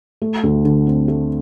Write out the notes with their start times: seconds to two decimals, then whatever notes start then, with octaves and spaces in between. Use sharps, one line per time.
0.22 A3
0.43 D2
0.65 D3
0.87 C4
1.08 A3